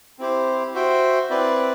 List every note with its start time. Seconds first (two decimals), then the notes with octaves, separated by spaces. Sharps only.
0.19 C4 E4 G4 C5
0.74 F#4 C5 E5 G5
1.30 C4 E4 B4 D5